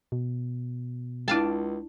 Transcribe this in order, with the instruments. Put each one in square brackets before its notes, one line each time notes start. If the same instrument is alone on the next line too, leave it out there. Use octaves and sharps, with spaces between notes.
[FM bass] B2
[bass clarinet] C#2 [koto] D4 F5 A5 [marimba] E4 G5